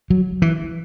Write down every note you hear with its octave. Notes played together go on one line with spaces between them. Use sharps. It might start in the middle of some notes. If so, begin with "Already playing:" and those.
F#3
E3